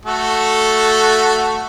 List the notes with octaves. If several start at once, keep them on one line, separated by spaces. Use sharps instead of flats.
A3 F#4 A4